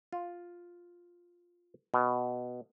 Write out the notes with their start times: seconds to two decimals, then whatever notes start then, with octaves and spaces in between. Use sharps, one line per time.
0.13 F4
1.94 B2